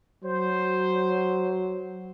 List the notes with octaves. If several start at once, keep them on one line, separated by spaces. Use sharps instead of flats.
F#3 C5